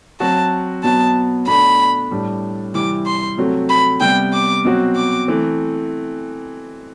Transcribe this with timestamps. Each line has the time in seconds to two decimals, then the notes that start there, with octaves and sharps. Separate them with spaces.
0.20 F#3 C4 F#4 A5
0.84 B2 F#3 B3 A5
1.47 B2 A3 D4 B5
2.11 A2 G3 D4
2.74 C3 E3 G3 C4 E4 D6
3.06 C6
3.38 C3 F#3 A3 C4
3.69 B5
4.01 C3 G3 B3 G5
4.33 D6
4.65 B2 F#3 C4 F#4
4.96 D6
5.28 E3 A3 C4